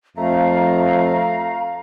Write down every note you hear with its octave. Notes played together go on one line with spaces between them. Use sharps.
F2 A3 F5 A#5